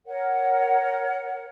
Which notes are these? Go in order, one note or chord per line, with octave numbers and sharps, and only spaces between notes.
A#4 C#5 F#5